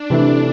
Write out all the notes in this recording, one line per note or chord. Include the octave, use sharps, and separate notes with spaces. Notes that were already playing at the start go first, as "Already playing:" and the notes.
Already playing: D4
C3 E3 A3